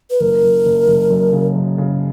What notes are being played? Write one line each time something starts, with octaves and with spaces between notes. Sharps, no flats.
B4
F#1 A#4
F#2
F#1
F#1
F#2
C#3
F#2
C#3